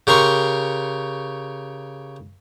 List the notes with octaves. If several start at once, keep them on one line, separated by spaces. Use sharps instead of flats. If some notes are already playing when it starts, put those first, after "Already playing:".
C#3 G4 A#4 C6 C#6